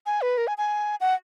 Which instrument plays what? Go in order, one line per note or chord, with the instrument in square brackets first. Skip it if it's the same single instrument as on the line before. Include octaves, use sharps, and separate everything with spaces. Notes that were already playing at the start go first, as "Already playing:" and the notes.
[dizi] G#5
B4
A#4
G#5
G#5
F#5